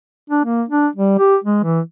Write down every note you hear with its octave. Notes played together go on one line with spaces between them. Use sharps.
D4
A#3
D4
G3
G4
G#3
E3